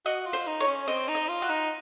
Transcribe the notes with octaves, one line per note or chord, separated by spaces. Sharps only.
F#4 D#5
F4
C5
D#4
C#5
C#4
C4 D#5
D#4
D#5
F4
F#4
D#4